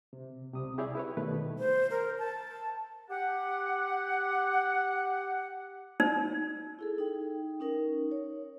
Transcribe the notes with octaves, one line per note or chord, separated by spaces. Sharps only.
C3
C#2 C3 G3 D#6
E4 G4 G#4 C#5 D5 E5
E4 B4 C#5
B2 D#3 G3 A3 B4
C5
A#4
A5
G4 F#5
D#4
E4 G#4 A4
D#4 G5
C#4 D#4 A#4
C#5